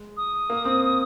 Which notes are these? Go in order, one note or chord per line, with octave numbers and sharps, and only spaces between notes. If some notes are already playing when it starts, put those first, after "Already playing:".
Already playing: G#3
D#6
A#3
C4